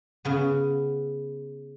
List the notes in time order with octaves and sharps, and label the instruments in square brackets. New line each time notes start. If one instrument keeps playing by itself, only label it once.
[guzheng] C#3 B3